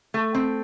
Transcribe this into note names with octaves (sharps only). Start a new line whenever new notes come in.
A3
C4